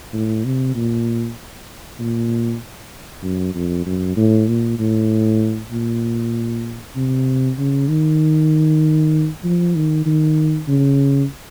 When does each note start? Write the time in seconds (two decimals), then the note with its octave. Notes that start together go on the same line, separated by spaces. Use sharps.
0.13 A2
0.45 C3
0.75 A#2
1.99 A#2
3.23 F#2
3.55 F2
3.86 F#2
4.17 A2
4.48 A#2
4.79 A2
5.72 A#2
6.96 C3
7.58 C#3
7.88 D#3
9.44 F3
9.75 D#3
10.06 D#3
10.68 C#3